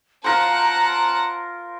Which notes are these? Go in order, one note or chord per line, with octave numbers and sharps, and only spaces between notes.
F4 A#4 C5 F#5 A5 A#5